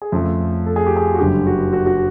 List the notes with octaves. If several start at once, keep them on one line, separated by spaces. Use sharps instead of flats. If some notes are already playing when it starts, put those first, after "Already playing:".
G#4
F2 C#3 F3 A3 A4
A4
G#4
G4
G#4
F#4
F#1 F#2 D3 G3 G4
F#4
F#4
F#4